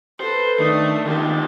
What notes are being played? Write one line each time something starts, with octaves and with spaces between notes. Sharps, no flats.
A4 B4 C5
D#3 A3 D4 D#6
C#2 A#2 D#3 G4